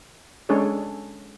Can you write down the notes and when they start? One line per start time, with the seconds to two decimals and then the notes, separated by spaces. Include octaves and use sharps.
0.49 G#3 C#4 D4 G#4 A4 C#5